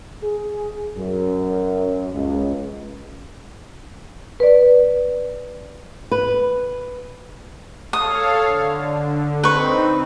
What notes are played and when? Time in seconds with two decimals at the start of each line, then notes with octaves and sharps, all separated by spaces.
0.23 G#4
0.97 F#2
2.14 C#2
4.40 B4 D5
6.11 B4
7.93 A4 C#5 F5 D#6
8.47 D3
9.43 C4 D#4 B4 C#6